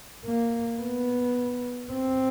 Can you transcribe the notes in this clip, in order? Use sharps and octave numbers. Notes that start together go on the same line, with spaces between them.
A#3
B3
C4